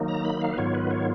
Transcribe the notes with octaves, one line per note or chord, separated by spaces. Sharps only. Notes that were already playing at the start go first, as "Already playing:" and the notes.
Already playing: D#3 F#3 A#3 D#4
A#5
B5
F5
B4
G#2 D#3 F#3 B3 F4 C#5
B4
C#5